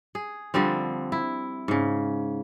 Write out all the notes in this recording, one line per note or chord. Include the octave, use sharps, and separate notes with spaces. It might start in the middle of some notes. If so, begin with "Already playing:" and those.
G#4
D3 F3 G3 C4
E4
G#2 C#3